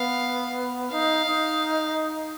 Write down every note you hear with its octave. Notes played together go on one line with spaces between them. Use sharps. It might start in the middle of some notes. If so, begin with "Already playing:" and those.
Already playing: B3 F5
D#4 F5
D#4